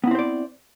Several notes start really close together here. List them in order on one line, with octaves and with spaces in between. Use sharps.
B3 E4 C4 C5 D5